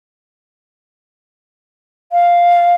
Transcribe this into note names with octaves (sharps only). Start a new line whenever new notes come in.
F5